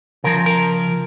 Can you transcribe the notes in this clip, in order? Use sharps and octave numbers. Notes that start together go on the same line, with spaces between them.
C#3 F3 A#4
A#4